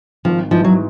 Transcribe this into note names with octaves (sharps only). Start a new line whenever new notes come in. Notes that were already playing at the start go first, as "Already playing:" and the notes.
G#1 F3
G#2 E3 F3
F#3